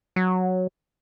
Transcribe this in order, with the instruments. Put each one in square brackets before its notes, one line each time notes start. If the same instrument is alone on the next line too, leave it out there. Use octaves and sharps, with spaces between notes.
[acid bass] F#3